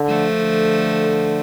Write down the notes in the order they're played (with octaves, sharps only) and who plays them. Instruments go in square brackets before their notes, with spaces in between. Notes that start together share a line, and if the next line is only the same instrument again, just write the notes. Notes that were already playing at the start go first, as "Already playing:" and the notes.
Already playing: [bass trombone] D3
[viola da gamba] F3 A3
[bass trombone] D3